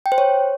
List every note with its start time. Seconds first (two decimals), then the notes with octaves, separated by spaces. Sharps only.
0.06 G5
0.12 C5
0.18 C#5